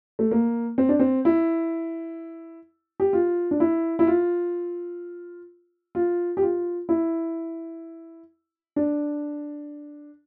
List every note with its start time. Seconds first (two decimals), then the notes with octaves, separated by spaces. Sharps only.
0.19 A3
0.31 A#3
0.78 C4
0.89 D4
1.00 C4
1.25 E4
3.00 G4
3.13 F4
3.51 D4
3.60 E4
3.99 E4
4.07 F4
5.95 F4
6.37 G4
6.42 F4
6.89 E4
8.76 D4